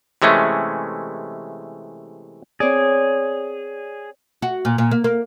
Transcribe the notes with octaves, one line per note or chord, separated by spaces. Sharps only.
C3 E3 G#3 A3 C#4
C4 G#4 C#5 D5
F#4
A#2
A#2
A#3
A#3